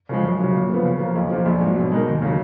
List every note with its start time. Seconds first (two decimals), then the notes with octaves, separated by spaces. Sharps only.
0.09 C#3 F3 G#3
0.24 F#2
0.40 C#3 F#3
0.54 A#2
0.70 F3 B3
0.85 C#3
1.00 F3 A#3
1.15 B1
1.31 A#2 F3
1.46 A#1
1.61 G#2 F#3
1.76 B2
1.92 G#3 D#4 A#4
2.07 D#2
2.22 C#3 F#3